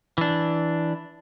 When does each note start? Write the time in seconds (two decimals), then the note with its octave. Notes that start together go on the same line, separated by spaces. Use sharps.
0.18 E3 D4